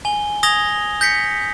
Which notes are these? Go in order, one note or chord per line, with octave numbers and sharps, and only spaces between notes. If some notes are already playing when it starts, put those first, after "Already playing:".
G#5 G7
D#6 G#6 A#6 F7 G7
G6 A#6 B6 C#7